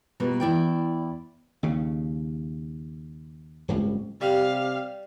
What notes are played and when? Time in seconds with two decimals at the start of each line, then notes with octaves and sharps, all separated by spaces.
0.20 B2 G3 A#3 F4 B4
0.40 E2 E4 D5 G5
1.63 D#2 C#3
3.68 D1 G1 C#2
4.21 C3 G3 G4 F5